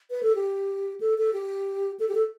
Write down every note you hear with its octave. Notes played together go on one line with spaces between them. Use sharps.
B4
A4
G4
A4
A4
G4
A4
G4
A4